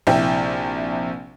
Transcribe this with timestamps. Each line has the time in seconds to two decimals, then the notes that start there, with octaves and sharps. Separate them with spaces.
0.07 A#1 C3 E4 G5